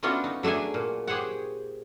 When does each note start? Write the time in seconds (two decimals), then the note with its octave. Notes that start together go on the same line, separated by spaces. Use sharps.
0.03 A3 B3 C#4 D4 F4 F#4
0.24 D#4
0.43 F#3 A3 D4 G#4 G#5
0.74 A#2
1.07 G4 G#4 C5 C#5 F#5